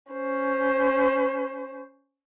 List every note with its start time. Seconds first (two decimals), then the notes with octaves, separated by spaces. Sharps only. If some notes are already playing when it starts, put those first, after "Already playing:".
0.12 C#4 C5